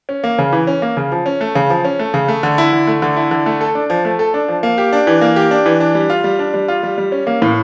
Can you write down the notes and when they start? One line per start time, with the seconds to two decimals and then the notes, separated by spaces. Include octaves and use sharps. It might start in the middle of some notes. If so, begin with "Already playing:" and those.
0.09 C#4
0.24 A#3
0.38 C#3
0.53 E3
0.67 C#4
0.82 A#3
0.97 C#3
1.12 F3
1.26 C#4
1.41 A3
1.55 C#3
1.70 F3
1.85 C#4
1.99 A3
2.14 C#3
2.28 A3
2.43 D3
2.58 E4
2.72 D3
2.87 A3
3.02 D3
3.16 E4
3.31 D3
3.46 A3
3.61 A4
3.75 D4
3.90 F3
4.05 A3
4.19 A4
4.34 D4
4.48 F3
4.63 A#3
4.78 G4
4.93 D4
5.07 E3
5.21 A#3
5.36 G4
5.51 D4
5.66 E3
5.80 D4
5.95 G3
6.10 F4
6.24 G3
6.39 D4
6.54 G3
6.68 F4
6.83 G3
6.98 G3
7.12 C#4
7.27 A#3
7.42 A2